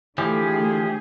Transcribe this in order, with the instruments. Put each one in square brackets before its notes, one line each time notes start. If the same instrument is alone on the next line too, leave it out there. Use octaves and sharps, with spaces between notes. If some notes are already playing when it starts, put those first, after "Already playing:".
[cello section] D3 A3 G#4 [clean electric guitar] E3 F3 [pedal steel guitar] G4